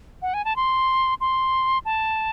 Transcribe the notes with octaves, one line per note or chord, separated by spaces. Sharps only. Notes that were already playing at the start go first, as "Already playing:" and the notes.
F#5
G#5
A5
C6
C6
A5